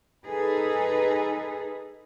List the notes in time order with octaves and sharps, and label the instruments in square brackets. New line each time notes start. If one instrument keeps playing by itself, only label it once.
[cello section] D#4 G#4 A4 B4